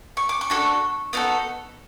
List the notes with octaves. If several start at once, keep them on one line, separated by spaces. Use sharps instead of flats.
C#6
D6
C#6
D4 F#4 A4
B3 D#4 F#4 A4